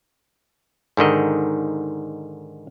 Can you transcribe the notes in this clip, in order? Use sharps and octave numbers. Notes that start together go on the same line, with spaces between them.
G#2 D3 D#3 D#5